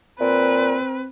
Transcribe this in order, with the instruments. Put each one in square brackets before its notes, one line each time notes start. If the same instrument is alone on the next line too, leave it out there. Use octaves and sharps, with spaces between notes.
[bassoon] A#2 [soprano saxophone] C4 [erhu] B4